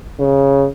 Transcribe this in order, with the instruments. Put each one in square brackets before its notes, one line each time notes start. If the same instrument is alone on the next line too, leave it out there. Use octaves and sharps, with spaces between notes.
[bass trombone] C#3